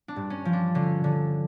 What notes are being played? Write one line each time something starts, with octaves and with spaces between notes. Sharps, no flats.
D4
G2
C#4
F3
D4
D3 C#4
D3